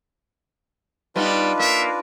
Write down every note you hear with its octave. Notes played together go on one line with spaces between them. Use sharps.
G3 B3 D4 D#4 F4 B4
A#3 E5